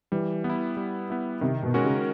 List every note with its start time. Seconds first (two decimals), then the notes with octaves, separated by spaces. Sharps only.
0.12 E3 G3
0.44 B3
0.49 E4
0.77 G3
1.10 B3 E4
1.41 C3 D#3
1.63 B2
1.74 G#3 C#4 F#4 A#4
1.85 C#3